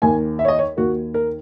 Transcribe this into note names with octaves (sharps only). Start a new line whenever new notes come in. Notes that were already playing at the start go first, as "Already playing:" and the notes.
D#2 D#3 A#3 G#5
E5
C#5
D#5
C#5
D#2 D#3 A#3 F#4
A#4